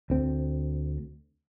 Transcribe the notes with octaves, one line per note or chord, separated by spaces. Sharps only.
D2 C4